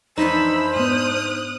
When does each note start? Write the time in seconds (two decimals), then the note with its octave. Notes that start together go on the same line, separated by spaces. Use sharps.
0.18 F2 E3 D4 D#4 C5 B5 E6
0.76 G#2 B3 D#6 F6 F#6